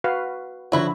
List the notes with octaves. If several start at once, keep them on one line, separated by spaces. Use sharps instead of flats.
F#4 B4 F5
D3 F3 F#3 E4 F#4